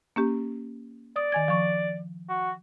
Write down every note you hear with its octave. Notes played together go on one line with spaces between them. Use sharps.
A#3 C#4 G4
D5 D#6
D#3 G#5 G#6
F3 C#6
F#4